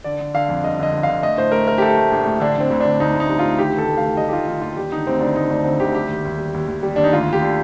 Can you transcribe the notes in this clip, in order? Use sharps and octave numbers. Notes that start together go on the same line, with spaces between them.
D3 D5
D3
D3 F5
F2
G1 D#5
D3 D#5
G1
D3 F5
A3 D#5
A2 C5
A3 A#4
A3 A#4
G4
A3 A4
A3
A#1
A2
D3 D4
D3 C4
D2
D2 D4
D2 D#4
D2
D#4
G3
F4
D2
D#3 G4
F1 A4
F1
F5
D#3
G3 D#5
G4
D#3 F4
D#3 F4
D#2 F4
G3 G4
D3 D#4
D2 C4
D2 D4
D2 D#4
D2 D4
D3 C4
D2 G4
G3 G4
D#2
D#2
G3
D#2
D#2
G3
D#2 D4
D#4
D2 F4
D2 G4
D3